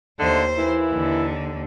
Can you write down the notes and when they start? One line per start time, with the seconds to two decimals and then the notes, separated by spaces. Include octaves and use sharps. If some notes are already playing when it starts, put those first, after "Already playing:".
0.20 D#2 D3 A3 C5 D#5
0.58 E3 A#3 E4
0.93 D#2 D3